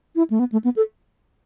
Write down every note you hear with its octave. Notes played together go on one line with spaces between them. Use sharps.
E4
A3
B3
A3
B3
A4